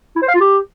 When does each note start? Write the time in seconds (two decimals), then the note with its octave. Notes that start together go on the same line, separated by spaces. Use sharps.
0.16 E4
0.22 C5
0.28 F5
0.34 F4
0.40 G4